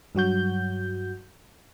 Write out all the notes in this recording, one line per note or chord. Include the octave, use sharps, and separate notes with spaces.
G2 F#3 F#4 G6